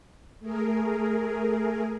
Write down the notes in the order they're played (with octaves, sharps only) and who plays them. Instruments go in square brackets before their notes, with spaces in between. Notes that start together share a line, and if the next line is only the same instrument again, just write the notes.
[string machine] A3 G#4 A#4